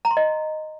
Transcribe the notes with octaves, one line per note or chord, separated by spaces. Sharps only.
A#5
C6
D#5